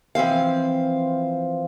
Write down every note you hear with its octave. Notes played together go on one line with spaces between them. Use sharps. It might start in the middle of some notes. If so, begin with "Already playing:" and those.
E3 F3 C4 F5